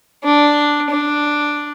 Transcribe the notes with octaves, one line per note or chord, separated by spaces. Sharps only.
D4
D4